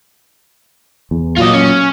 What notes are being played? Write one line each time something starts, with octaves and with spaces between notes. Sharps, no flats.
E2
A#2 F#3 F4 D#5
C#4